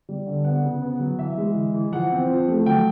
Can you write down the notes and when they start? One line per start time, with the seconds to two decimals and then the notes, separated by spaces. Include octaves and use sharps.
0.09 G3
0.26 D3
0.44 B3 F#5
0.63 C#3
0.82 B3
1.00 F#3
1.19 E3 E5
1.37 G#3
1.55 E3
1.74 E3
1.92 F3 F#5
2.11 C4
2.29 F3
2.49 A3
2.66 F#3 G5